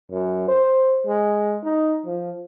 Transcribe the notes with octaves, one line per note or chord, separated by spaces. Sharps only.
F#2
C5
G#3
D#4
F3